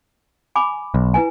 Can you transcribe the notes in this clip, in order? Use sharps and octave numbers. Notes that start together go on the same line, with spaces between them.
G#5 B5 D6
B1
E4 B4 G#5